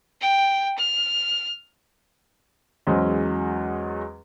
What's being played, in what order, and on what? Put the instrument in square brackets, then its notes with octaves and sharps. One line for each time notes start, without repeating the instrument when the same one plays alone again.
[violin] G5
F6
[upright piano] E2 F#3 G#3 C#4 C5 D#5